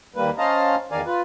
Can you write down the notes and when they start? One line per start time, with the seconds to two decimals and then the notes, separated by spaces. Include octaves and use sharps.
0.16 D#2 G3 A#3 B4
0.38 C#4 C5 D#5 F5 A5 A#5
0.91 E2 D#3 A#4 D5 F5 G#5
1.06 F4 B4